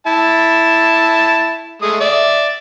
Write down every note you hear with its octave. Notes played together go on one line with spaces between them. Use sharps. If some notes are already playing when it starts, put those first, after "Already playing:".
E4 A5
G#3 A3 D#6
D5 E5